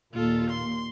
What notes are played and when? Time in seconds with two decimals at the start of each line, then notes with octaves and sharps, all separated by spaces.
0.14 D#2 A#2 F4 A4
0.50 C6